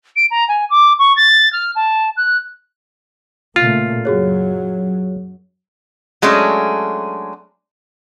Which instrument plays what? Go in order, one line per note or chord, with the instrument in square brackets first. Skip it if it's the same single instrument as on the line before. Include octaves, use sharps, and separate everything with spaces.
[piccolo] D7
A#5
G#5
D6
C#6
A6
F6
A5
F#6
[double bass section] A#2 C#3 A3 [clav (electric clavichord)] F4
[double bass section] F#2 F#3 [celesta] F#4 G#4 C#5
[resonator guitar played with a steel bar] F#3 G#3 A3 C#4 D4